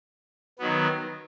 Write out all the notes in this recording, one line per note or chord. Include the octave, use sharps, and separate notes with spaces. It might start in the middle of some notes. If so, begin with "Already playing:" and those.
D#3 F#3 B3